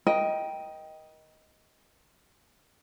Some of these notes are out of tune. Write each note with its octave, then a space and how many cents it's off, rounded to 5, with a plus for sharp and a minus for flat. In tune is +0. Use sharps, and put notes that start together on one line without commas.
A#4 +35 D#5 +10 G5 +0